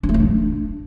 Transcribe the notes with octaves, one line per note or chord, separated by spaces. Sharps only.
D4
A3
E4
D4